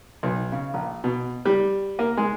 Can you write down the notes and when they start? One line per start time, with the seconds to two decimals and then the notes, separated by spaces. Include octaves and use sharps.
0.23 B1
0.52 C#3
0.74 A#1
1.04 B2
1.45 G3
1.99 A#3
2.17 G#3